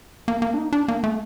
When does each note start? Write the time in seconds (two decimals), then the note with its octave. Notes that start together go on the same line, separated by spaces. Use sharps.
0.28 A#3
0.42 A#3
0.54 D4
0.58 D#4
0.73 D4
0.88 A#3
1.04 A3